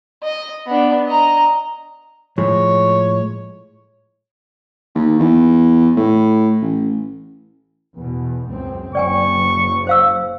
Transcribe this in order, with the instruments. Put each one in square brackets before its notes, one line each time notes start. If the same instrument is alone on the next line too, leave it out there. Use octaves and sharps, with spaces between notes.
[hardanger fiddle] D#5
B3 D4
D#5 A#5
[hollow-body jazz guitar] A2 F3 G#3 [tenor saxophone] C#5
[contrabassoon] D#2
E2
A2
A1
[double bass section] E2 B2
C#2 F#2 C4
[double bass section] F#1 C#3 [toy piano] D5 G5 G#5 [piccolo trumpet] C#6
[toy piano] C5 F5 E6